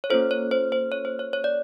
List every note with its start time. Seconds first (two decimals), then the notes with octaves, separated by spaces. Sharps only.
0.04 C#5
0.10 A#3 C#4 F4 A4 C5
0.31 C#5
0.51 C5
0.72 C5
0.92 C#5
1.05 C5
1.19 C#5
1.33 C#5
1.44 D5